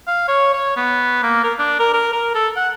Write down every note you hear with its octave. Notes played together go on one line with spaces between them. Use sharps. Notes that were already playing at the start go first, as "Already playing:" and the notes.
F5
C#5
C#5
B3
A#3
A#4
D4
A#4
A#4
A#4
A4
F#5